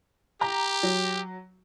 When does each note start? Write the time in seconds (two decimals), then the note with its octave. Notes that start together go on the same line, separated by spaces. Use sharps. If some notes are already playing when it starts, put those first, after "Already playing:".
0.41 G4 A#5
0.83 F#3